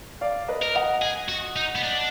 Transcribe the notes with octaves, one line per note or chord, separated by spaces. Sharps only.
D5 F5
B4 D#5
A#4
D#5 F#5
G#4
F#4
D#4
B3
D4